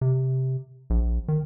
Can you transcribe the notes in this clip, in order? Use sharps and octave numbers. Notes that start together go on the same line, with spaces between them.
C3
A#1
D#3